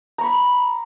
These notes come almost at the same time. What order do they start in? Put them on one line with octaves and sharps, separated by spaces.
A#5 C#6 B5